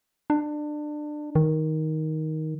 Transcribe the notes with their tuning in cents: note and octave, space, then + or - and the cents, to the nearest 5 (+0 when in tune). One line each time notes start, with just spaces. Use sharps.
D4 +25
D#3 +10